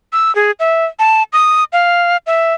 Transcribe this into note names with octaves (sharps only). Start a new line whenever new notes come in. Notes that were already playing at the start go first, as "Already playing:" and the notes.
E6
G#4
E5
A5
D#6
F5
E5